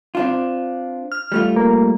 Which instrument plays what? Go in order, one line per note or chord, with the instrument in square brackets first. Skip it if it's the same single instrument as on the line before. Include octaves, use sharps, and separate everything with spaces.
[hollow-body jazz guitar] C4 D4 F4
[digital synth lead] F6
[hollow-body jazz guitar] G3 A3 F4
[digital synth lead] A#3